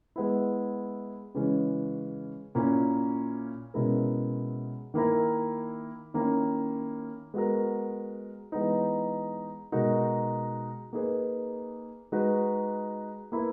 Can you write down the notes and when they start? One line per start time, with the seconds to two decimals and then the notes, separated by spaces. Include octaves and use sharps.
0.16 G#3 B3 E4
1.34 C#3 E3 G#3 C#4 G#4
2.55 A#2 A#3 C#4 E4 A#4
3.74 B2 G#3 C#4 E4 A#4
4.94 D#3 A#3 E4 A#4
6.14 D#3 A#3 C#4 E4
7.34 G#3 B3 F#4 A#4
8.52 E3 G#3 B3 D#4
9.72 B2 G#3 D#4 F#4 A#4
10.93 A#3 D#4 G#4 B4
12.12 G#3 D#4 F#4 B4
13.32 A#3 E4 B4